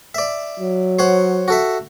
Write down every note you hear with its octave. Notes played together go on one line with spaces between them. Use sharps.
D5 E5
F#3
C5 C#5 F#5
F#4 A4 E5